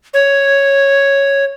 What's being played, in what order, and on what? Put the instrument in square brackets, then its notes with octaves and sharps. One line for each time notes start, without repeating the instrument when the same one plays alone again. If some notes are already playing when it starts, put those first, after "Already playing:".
[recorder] C#5